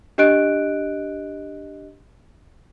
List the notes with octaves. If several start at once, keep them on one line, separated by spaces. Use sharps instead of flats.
D4 G4 D#5 F#6 D7